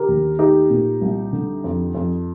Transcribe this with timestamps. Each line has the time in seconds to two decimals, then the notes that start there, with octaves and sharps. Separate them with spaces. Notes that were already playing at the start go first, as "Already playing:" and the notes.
Already playing: D3 G4 A#4
0.08 D#2
0.39 A3 D#4 G4
0.70 A#2
1.01 C2
1.33 D3
1.64 F2
1.95 F2